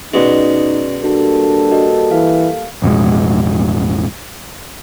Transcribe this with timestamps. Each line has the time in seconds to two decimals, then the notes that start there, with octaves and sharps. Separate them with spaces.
0.14 B2 G#3 C#4 D#4 D5
1.04 G3 A#3 D4 F#4 A4
1.71 F#4 D#5
2.11 E3 F5
2.82 A1 F2 B2 G#3